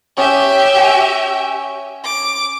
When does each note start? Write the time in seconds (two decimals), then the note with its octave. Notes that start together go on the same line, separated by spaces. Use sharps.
0.17 C#4 G4 E5 D#6
0.77 G#5
2.04 D6